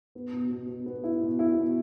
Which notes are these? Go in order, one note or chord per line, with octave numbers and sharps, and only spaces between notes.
B3
B2
B2
B2
B3
E4
B2
E4
B2